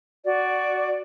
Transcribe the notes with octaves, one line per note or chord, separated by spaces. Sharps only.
F#4 D5